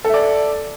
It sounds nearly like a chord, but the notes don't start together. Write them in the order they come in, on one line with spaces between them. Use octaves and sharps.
A4 E5 D5